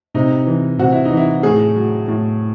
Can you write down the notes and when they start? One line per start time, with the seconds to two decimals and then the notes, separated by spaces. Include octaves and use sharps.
0.14 C3 D#4
0.47 E3
0.79 C3 F#4
0.92 E4
1.05 D#4
1.11 E3
1.17 E4
1.43 A2 G#4
1.76 F#3
2.08 A2